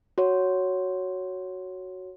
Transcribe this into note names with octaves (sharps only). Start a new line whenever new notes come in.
F#4 C#5